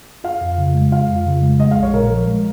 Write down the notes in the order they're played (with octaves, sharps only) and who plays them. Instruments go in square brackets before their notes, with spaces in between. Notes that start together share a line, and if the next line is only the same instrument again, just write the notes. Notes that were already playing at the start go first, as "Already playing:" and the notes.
[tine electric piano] F4 [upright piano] F5
[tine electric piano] F2
C#3
G#3
[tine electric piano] F4 [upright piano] F5
[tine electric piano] F2
C#3
G#3
[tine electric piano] G#3 [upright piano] D#5
[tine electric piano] A#1 [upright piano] F5
[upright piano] C#5
[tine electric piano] A#2 [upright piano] A#4
[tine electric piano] F3
G#3